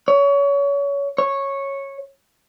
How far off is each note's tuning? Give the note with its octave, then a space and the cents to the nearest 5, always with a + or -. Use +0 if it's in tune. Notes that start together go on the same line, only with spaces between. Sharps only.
C#5 +30
C#5 -10